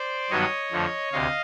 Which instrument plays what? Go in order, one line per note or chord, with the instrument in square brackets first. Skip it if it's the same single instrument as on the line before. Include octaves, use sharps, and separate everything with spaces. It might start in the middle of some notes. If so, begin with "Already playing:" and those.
Already playing: [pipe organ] C5 D5
G2 D#3 F#3 B3 D4 C#5 D#5
F2 D3 F3 A3
D2 C3 D#5 F5